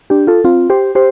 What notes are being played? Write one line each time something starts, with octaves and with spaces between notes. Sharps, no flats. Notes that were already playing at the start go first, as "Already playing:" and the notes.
D4 G4
F4 A4
C4 F4
G4 C5
G4 C5